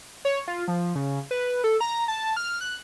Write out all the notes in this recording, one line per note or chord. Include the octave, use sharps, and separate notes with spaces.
C#5
F4
F3
C#3
B4
A4
A#5
A5
F6
F#6